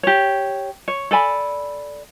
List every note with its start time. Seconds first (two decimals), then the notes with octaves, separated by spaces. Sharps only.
0.03 G4 C#5
0.88 C#5
1.11 A4 D5 G#5 B5